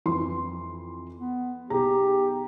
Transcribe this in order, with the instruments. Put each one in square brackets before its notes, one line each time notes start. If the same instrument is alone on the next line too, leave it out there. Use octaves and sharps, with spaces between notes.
[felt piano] F2 E3 C6
[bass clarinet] B3
[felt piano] B1 G#4 A#5 [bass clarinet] G4